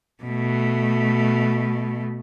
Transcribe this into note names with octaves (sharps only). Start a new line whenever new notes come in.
B2 A3